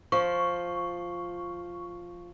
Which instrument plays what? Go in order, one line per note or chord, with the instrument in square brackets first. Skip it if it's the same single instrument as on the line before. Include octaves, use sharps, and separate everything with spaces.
[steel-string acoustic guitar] F3 [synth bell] C#6